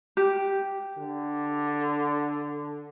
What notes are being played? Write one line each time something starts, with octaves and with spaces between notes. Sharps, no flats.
G4
D3